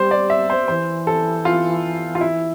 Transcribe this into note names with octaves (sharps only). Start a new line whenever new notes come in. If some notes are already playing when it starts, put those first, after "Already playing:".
Already playing: G3 C5
D5
E5
C5
E3 C5
A4
F4
F4
E4